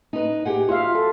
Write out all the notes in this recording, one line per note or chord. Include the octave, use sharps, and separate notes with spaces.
D#4 B4
G4 G#4 F#5
F4 F#4 E5 F5
A4